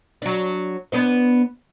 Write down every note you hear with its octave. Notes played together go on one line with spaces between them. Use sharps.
F#3 D4
B3 D4 C5